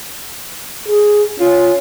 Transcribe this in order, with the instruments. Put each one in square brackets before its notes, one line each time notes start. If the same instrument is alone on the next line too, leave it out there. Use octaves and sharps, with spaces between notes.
[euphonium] G#4
[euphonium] C#4 [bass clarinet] F4